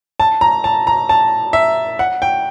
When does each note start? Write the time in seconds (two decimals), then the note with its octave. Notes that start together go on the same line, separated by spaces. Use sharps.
0.20 A5
0.41 A#5
0.64 A5
0.87 A#5
1.09 A5
1.53 E5
1.99 F#5
2.22 G5